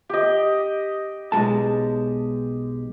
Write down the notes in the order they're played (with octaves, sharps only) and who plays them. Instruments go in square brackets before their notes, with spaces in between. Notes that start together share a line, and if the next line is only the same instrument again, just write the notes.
[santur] G4 D#5
[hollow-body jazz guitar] B1 G#3 A5